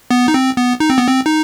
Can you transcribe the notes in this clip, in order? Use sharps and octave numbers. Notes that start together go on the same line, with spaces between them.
B3
D#4
C4
B3
D#4
C4
B3
C4
D#4